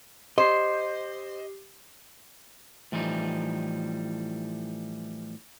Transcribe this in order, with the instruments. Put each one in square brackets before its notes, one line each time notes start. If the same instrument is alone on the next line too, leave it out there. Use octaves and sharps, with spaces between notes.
[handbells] G4 C7 [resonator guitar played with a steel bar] C5 [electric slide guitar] D#5
[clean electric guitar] A2 E3 F3 G3 D#4